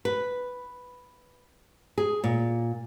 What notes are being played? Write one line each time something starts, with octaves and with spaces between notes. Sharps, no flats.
B4
G#4
A#2